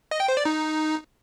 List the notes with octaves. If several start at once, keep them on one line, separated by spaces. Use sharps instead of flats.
D#5
G5
C5
D5
D#4